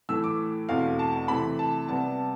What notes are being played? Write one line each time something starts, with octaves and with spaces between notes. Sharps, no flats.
A2 E3 A3 E6
D6
E2 B2 A3 C4 F5
A5
C3 E3 A3 C4 B5
A5
C3 G3 B3 A5